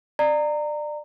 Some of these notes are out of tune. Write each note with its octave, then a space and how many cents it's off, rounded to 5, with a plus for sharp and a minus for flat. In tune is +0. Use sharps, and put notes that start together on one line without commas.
D5 +25 A#5 -20